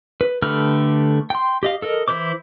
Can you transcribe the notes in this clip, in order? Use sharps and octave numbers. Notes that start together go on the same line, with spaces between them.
B4
D3 A3 G4 B4 F6
G5 C6
G4 D#5 F5
A4 A#4 D#5
E3 E4 A#4 C5 D6